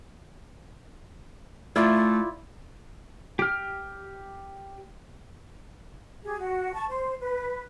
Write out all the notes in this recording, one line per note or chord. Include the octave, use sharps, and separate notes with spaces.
A3 E4 F4 D5
G4 F6
G4 G#4
F#4
A5 C#6
C5
B4